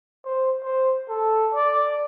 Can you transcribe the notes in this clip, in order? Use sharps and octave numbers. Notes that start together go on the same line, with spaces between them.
C5
C5
A4
D5